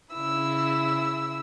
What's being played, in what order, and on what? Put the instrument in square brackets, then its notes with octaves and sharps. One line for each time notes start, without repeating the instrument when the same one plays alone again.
[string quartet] C#3 E4 E6